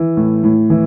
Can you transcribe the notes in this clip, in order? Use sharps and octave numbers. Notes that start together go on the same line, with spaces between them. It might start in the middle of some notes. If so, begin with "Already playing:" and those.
Already playing: E3
A2
A2
E3